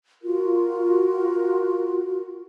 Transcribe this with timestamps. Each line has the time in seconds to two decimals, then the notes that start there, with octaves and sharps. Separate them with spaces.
0.23 F4 F#4 A#4